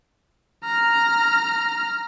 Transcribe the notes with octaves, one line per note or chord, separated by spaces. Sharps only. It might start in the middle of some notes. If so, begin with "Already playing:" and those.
A#5 F6